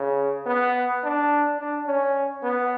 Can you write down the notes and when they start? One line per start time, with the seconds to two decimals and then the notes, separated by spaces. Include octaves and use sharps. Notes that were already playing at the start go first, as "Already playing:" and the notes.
Already playing: C#3
0.47 B3
1.04 D4
1.59 D4
1.87 C#4
2.44 B3